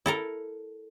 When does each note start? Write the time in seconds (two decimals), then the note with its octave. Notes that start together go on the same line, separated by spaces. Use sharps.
0.06 E4 A4 A#4